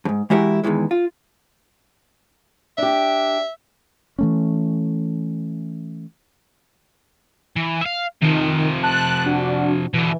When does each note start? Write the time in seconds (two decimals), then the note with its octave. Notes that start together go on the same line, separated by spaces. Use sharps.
0.05 F2 G#2
0.30 E3 G#3 E4 F#4 G4 A#4
0.64 E2 G#2 D#3 E3 G#3
0.91 F4
2.78 D4 G4 E5
4.19 E3 A3 C#4
7.56 E3
7.81 E5 F5
8.22 C3 D#3 F3
8.83 A5 F#6
9.26 D4 F#4
9.94 B2 D3 E3